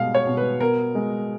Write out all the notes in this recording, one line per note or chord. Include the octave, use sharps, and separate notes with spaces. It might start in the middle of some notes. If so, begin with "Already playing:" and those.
Already playing: B2 G#3 F5
C#5
B2
B4
B3 A#4
G#3